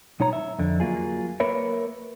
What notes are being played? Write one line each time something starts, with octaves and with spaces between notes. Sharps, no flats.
B1 D#4 C#5 A#5
E5
F2 D3
F#3 A#3 F4 G#4
A#3 A#4 B4 C#5 E5